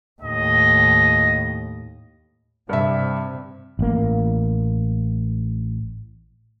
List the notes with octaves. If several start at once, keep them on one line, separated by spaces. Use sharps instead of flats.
D#2 A2 D#5
G2 C3 E5
A1 A#3